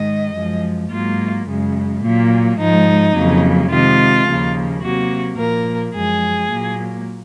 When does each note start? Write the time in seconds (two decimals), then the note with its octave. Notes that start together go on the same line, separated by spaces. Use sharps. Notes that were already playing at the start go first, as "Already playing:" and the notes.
Already playing: G#2 D#3 G#3 D#5
0.34 F#2 F3 G#3
0.90 G#2 F#3 A#3 F4
1.46 F#2 C#3 G#3
2.02 A#2 F#3 A#3
2.58 G#2 F3 G#3 D#4
3.14 F2 C#3 F#3 A#3
3.70 C3 D#3 G#3 F4
4.26 D#2 C#3 F3 A#3
4.81 C3 F#3 A#3 F#4
5.37 A#2 F3 A#3 A#4
5.93 F#2 F3 G#3 G#4
6.49 A#2 F#3 A#3